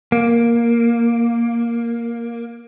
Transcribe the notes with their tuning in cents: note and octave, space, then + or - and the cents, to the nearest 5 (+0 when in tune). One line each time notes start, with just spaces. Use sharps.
A#3 +5